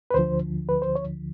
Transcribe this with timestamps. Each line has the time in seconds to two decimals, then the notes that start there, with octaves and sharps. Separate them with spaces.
0.11 B4
0.14 D2 D3 F3 C5
0.69 B4
0.82 C5
0.95 C#5